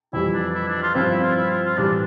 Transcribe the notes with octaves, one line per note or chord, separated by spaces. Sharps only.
F2 E3 G3 E4
D4
E4
D4
F4
G2 F3 C4 E4
E4
F4
E4
F4
F4
A2 E3 G3 D4